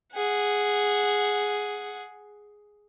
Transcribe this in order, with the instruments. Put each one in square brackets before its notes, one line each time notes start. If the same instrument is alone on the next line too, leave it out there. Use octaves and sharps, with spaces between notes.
[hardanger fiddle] G#4 F#5